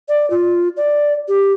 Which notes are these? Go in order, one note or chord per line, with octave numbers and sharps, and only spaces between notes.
D5
F4
D5
G4